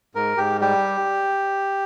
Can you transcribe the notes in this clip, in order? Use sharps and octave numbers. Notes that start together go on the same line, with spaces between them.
G#2 A#4
G#2 G4
G3 G4